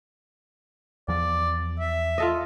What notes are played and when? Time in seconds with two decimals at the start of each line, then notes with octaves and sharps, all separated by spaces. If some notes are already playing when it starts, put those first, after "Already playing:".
1.08 E2 F3 D5
1.79 E5
2.18 F4 A4 D#5